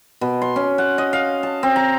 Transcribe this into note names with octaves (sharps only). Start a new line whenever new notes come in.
B2
C6
C#4
F#5
D#5
F5
A5
C4
A#5